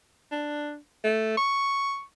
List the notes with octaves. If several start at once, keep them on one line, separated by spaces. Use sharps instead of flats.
D4
A3
C#6